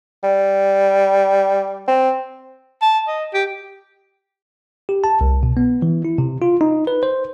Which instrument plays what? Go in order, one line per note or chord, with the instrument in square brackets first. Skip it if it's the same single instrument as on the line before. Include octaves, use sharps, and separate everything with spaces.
[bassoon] G3
C4
[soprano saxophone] A5
D#5
G4
[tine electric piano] G4
A5
C2
B2
B3
E3
E4
C3
F4
D#4
B4
C5